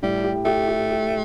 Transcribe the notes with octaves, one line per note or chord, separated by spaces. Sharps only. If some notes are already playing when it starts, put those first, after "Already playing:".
A2 G3
G4
A3 G4
G4
G4